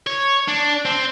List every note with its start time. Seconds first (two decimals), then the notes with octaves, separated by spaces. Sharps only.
0.07 C#5
0.48 D4
0.85 C4